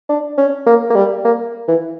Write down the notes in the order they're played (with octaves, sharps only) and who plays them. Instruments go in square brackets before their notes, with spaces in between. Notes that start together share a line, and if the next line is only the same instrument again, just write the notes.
[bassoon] D4
C#4
A#3
A#3
G3
A#3
E3